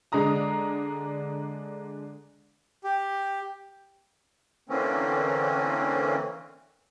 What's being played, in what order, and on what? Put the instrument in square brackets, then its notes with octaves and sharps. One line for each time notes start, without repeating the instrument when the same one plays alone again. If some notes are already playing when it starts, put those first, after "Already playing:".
[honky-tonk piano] D3 G#3 D4 A#5 D#6
[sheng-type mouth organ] G4
[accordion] D3 E3 A#3 C4 C#4